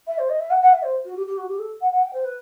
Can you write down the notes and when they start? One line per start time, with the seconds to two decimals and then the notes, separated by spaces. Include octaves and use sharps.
0.07 E5
0.18 C5
0.29 D#5
0.39 E5
0.50 F#5
0.61 F#5
0.72 E5
0.83 C5
1.05 F#4
1.16 G4
1.26 G4
1.37 F#4
1.48 G4
1.59 A4
1.81 F#5
1.91 F#5
2.02 G5
2.13 C5
2.24 B4